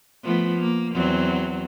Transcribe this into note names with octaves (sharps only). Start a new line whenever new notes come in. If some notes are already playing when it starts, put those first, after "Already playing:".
F3 A3 B3
A#3
E2 F#3 C4